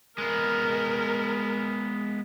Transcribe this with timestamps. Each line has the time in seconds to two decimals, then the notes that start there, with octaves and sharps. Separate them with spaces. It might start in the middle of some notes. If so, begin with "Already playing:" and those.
0.18 G#3 B3 A#4